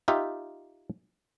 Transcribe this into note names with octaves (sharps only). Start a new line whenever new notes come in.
D#4 F4 G4 E5